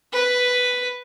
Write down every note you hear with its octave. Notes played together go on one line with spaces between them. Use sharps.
B4